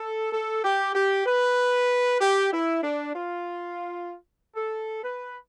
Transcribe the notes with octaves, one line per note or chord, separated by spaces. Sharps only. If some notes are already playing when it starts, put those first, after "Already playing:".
Already playing: A4
A4
G4
G4
B4
G4
E4
D4
F4
A4
B4